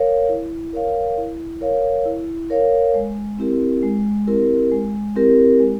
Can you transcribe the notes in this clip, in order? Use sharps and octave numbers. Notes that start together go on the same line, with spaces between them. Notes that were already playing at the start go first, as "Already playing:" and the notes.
Already playing: A#4 C#5 F5
E4
A#4 C#5 F5
E4
A#4 C#5 F5
E4
A#4 C#5 F5
G#3
C4 E4 G4 A#4
G#3
C4 E4 G4 A#4
G#3
C4 E4 G4 A#4
G#3